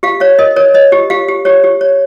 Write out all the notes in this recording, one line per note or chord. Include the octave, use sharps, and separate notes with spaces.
G4 F5
C#5 F5
A#4 D#5
A#4 C#5
C#5 D#5
G4
G4 F5
G4
G4 C#5
G4
C#5